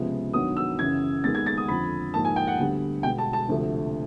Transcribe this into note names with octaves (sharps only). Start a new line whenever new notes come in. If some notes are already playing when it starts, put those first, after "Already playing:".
Already playing: C#2 C3 F3 G#3 B3
G2 D#3 F#3 B3 D#6
E6
F#2 C#3 E3 G#6
D#2 D#3 G#3 B3 A6
G#6
A6
D#6
F2 D3 F3 B5
G#2 F3 A#3 A5
G#5
G5
F#5
D2 D3 G3 B3
B2 G#3 B3 G5
A5
A5
D2 C3 F3 A3